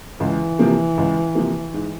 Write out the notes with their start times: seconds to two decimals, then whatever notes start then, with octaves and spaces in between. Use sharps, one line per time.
0.20 C#2 E3
0.59 C3 F3 A#3
0.98 C#2
1.35 C3 F3 A#3
1.74 G#2